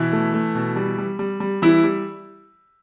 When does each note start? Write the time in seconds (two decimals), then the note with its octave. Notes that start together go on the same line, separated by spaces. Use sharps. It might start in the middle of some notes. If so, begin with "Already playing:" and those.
Already playing: B2 E3 E4
0.13 A3
0.34 A3
0.55 B2
0.76 G3
0.98 G3
1.19 G3
1.40 G3
1.62 E3 G3 E4
1.84 G3